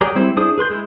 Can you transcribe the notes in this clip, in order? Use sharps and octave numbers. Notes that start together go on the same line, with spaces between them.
F#3 G4 G#4 A#4 D5
G3 C4 E4 C5
D4 E4 G#4 C5 D#6
G#4 B4 C6 G6
G#3 E4